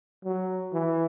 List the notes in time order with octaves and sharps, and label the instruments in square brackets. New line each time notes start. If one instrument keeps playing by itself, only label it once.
[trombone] F#3
E3